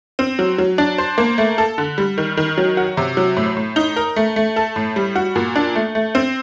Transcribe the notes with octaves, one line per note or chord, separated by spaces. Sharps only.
C4
F#3
F#3
D4
C5
A#3
A3
A4
D3
G3
D#3
D#3
F#3
F#4
C3
F#3
A2
A2
D#4
A#4
A3
A3
A4
A2
G3
F#4
A#2
D4
A3
A3
C4